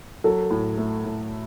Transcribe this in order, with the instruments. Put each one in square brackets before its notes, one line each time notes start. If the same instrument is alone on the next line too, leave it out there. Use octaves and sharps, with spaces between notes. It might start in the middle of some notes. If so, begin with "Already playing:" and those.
[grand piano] F#3 [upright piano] A4
[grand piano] A2
A3
A2